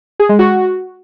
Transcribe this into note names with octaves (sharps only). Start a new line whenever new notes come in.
G#4
G#3
F#4